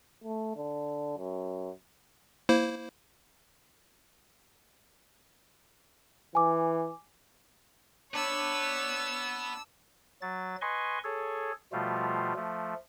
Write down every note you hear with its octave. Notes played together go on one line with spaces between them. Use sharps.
A3
D3
F#2
A#3 E4 C5
E3 G#5 D6
B3 D4 B4 C#5 E6
F#3 A6
B4 D#5 G#5 C6 C#6
G#4 A4 C#5
B2 F3 G3 A3 F4
F3 A3